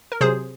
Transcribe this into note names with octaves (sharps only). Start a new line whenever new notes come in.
A#4
C3 F#3 G#4 C5